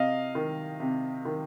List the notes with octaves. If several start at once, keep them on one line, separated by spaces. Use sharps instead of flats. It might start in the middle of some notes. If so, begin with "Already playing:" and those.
Already playing: C3 D#5 F5
D#3
C3
D#3